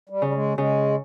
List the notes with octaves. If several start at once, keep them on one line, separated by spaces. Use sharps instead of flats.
G3
C#3
G3
G#3
C#3 G#3